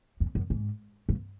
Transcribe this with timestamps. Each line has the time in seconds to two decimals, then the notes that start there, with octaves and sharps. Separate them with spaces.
0.20 F2
0.35 F#2
0.50 G#2
1.09 G2